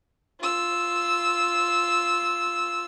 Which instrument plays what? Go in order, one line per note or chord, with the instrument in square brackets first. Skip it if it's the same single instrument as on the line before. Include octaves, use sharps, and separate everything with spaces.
[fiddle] F4 E6